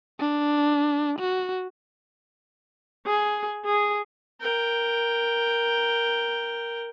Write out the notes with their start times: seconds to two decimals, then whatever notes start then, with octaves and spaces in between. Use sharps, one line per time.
0.20 D4
1.19 F#4
3.06 G#4
3.66 G#4
4.40 A#4 G5